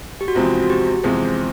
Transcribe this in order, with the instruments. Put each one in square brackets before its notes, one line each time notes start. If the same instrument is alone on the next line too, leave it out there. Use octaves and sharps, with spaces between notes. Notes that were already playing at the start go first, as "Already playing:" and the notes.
[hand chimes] G4
F#4
[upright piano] E2 C3 F3 G#3 C4 [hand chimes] F4
[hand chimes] F#4
G4
[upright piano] E2 C3 F3 G#3 C4 [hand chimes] G#4